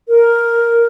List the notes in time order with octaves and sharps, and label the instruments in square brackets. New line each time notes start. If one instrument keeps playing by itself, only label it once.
[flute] A#4